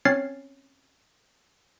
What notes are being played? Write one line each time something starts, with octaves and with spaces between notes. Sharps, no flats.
C4 C#4 C#5 F6 A6 C7